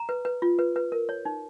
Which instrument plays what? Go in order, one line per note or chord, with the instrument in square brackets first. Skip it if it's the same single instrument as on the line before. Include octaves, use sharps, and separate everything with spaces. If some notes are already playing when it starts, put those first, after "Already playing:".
Already playing: [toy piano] A#5
B4
B4
F4
B4
B4
A#4
C#5
D#4